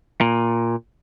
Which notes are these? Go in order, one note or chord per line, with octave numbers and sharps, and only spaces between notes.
A#2